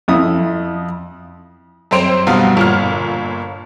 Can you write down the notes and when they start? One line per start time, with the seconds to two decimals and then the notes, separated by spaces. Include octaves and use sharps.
0.08 F2 E4 D#6
1.91 F#2 C4 C5 D7 F7
2.27 F1 G2 B2 B3 F5
2.57 G1 A#2 F6